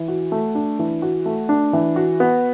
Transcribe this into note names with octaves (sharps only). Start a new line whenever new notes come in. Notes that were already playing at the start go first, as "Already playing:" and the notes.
Already playing: E3
F#4
A3
D4
E3
F#4
A3
D4
E3
F#4
B3